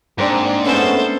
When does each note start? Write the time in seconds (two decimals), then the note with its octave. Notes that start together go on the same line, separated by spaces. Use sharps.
0.18 G#2 A#3 C4 D4
0.64 A3 B3 C#4 A4 C5